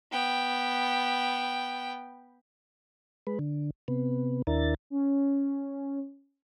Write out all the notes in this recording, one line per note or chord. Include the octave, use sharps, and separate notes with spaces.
B3 G5
G#3 B4
D3
C3 B3
D#2 D4 E4 A#4 A6
C#4